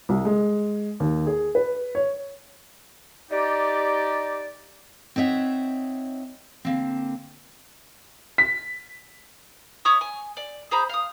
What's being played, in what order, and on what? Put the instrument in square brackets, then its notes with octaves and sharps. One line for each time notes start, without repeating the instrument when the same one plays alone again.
[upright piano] C2
G#3
D#2
G#4
B4
C#5
[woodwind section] D#4 G4 D5
[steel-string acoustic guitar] C4 D#4 C#5 E5 F#5
D3 A#3 C4
[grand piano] B6
[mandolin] C#5 E5 C#6 D#6
G#5
D5
G#4 C5 A#5 B5
F5 D#6